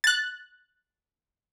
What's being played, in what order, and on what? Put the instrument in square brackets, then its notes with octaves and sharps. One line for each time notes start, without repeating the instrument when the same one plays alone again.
[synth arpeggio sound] F#6 A6